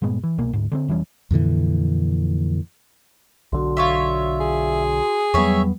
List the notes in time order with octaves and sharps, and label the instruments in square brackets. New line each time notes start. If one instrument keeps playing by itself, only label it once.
[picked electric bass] G2 A#2 G#3 B3
E3
C2 B2 A#3
D2 G#2
D3 A#3 C4
F1 E3 G3 C#4
[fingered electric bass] F2 A#2 D3 E3
[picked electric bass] B1 D3 [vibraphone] F#4 C6
[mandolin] F4 C#5 E5
[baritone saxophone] G#4
[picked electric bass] E2 B3 [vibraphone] F#3 G3 [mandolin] C#5 E5